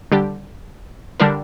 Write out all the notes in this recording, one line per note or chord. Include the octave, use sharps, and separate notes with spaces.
D3 G3 D4 G4
D3 G3 D4 A#4